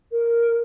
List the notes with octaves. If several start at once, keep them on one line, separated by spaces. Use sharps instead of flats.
A#4